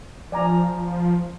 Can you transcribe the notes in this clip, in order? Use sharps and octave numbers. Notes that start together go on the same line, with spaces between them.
F3 D5 G#5 A#5